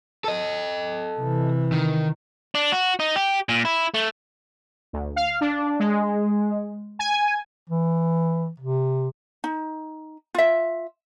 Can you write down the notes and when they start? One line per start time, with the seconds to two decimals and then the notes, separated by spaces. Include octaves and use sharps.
0.24 A4 D#5
1.19 C3 E3
1.72 D#3
2.55 D4
2.72 F#4
3.00 D#4
3.16 G4
3.49 A#2
3.65 E4
3.94 A3
4.93 D2
5.16 F5
5.41 D4
5.80 G#3
6.99 G#5
7.69 E3
8.59 C3
9.44 D#4
10.34 F4 E5